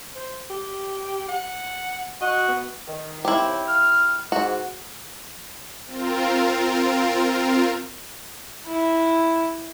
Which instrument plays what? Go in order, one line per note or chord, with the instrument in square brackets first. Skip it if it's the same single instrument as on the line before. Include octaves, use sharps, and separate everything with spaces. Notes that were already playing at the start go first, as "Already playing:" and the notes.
[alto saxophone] C5
G4
F#5
[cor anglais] F#4 [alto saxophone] D#5
[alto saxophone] B3
[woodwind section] D#3
[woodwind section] D#2 C4 [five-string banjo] E4 G4
[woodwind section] F6
[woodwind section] G#2 [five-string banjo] F#4
[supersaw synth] C4 F4 A#4
[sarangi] E4